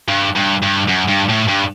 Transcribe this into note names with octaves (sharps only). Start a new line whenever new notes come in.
G2
G2
G2
F#2
G2
A2
G2